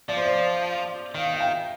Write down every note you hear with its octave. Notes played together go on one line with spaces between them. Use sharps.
F3 D5
C5
D5
D#3 F5
F5
G5